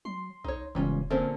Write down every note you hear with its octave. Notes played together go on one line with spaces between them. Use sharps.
F#3 C6
B1 D#4 C#5
E1 E2 G#2 C#3 G3 C#4 F4
A#2 D3 C4 C#4 A#4 C5